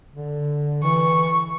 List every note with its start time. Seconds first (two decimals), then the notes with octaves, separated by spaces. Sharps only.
0.13 D3
0.83 E3 C#6